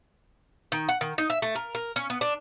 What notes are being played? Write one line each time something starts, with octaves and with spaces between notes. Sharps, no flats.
D#3
F#5
D#3
D#4
E5
A3
A#4
A#4
C#4
B3
D4